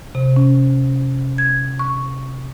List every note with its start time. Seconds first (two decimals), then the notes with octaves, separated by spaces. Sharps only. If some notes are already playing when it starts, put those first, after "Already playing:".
0.15 C3
0.36 C#4
1.38 G#6
1.79 C#6